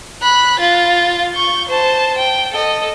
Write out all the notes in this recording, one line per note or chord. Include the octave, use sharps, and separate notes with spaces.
B5 F#6
F4 A6
C#6 G6
C5 A5
G5
A4 D#5